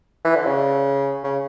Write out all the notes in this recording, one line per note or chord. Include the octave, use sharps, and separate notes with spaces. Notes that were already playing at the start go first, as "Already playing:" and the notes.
E3
D3
C#3
C#3